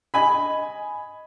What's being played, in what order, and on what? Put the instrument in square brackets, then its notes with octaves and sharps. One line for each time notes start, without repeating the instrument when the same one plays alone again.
[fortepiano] D#5 G#5 B5